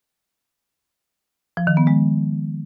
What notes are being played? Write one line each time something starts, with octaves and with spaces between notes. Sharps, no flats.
F3
D#3
B3
G#3